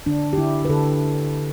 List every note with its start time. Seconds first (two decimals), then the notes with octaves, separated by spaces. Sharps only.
0.06 D3 D4
0.33 G4
0.38 D3 E4
0.65 B4
0.70 D3 A4